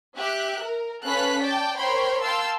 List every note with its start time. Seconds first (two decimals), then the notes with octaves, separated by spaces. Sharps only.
0.17 G4 E5 F#6
0.62 A#4
1.05 C#4 A4 B4 F5 F#6 B6
1.42 D5 G5 A5
1.80 A#4 C5 C#5 G5 B5 C6
2.24 F5 G5 A5 C6 E6